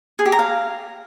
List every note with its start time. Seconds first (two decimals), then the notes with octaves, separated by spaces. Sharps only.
0.19 G#4
0.26 G4
0.32 A#5
0.39 F5